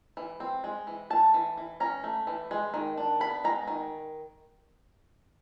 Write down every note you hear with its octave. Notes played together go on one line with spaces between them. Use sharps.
E3
C4
G#3
E3
A3 A5
E3
E3
C#4 A#5
A3
E3
G#3
D#3
D4
B3 B5
G#3 A#5
D#3